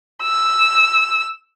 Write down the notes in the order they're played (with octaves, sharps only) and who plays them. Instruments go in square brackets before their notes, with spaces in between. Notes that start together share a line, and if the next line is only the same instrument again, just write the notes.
[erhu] E6